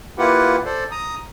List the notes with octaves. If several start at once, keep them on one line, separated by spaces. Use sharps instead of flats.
A#3 E4 F4 G4 B4 F#5
A4 C5 D5
A#5 D#6